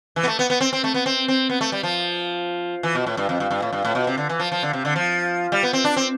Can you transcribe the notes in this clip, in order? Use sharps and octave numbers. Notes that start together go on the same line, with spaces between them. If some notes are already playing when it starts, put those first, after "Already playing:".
E3
B3
A3
B3
B3
C4
C4
A3
B3
C4
C4
B3
A3
G3
F3
E3
B2
A2
G2
F2
G2
G2
A2
G2
A2
B2
C3
D3
E3
F3
F3
D3
C3
D3
F3
G3
B3
C4
D4
C4